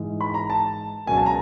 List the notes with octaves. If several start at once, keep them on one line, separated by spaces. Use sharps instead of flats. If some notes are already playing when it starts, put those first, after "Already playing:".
Already playing: G#2 E3 G#3
B5
A#5
A5
C#2 B2 F#3 A#3 G#5
A5
A#5